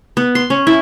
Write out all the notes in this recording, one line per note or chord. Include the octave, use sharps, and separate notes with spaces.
B3
C6
C#4
E4